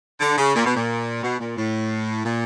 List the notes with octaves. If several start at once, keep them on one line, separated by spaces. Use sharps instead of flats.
D3
C#3
A#2
B2
A#2
B2
A#2
A2
A#2